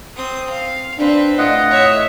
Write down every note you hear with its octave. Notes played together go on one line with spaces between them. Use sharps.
C4 D#6
F5
C4 D4 B4
A2 F4 D#5 F#5
C#5 E5